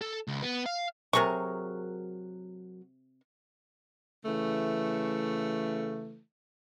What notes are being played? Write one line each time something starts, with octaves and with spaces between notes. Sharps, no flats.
A4
C#2
B3
F5
C3 F#3 G#4 A#4 C#6
C#3 E3 A3